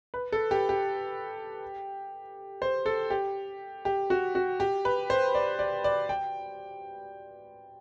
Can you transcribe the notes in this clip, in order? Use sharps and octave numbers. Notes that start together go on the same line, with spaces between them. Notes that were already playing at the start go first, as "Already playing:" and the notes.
B4
A4
G4
G4
C5
A4
G4
G4
F#4
F#4
G4
B4
C5
D5
D5
D5
G5